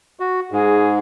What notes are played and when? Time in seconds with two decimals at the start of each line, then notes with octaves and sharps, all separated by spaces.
0.20 F#4
0.52 G#2 G#4